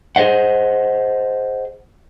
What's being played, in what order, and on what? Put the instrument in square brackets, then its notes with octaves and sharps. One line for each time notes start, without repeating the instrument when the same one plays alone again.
[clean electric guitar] G#4 C5 D5 D#5 F#5